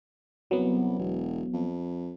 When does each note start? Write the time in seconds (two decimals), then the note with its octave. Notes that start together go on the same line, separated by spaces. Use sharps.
0.51 C2 F#3 B3
0.99 E1
1.53 F2